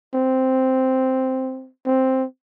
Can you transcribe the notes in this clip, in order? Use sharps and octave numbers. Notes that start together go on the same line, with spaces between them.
C4
C4